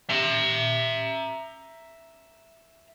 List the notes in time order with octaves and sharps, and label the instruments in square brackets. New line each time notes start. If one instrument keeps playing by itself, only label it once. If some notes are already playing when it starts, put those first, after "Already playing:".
[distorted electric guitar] E5 A#5